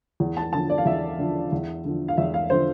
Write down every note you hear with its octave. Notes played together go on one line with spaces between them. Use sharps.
E2
A5
D3 F3 A5
D5
F5
E2 E5
D3 F3
E2
D3 F3
F5
E2 E5
F5
D3 F3 C5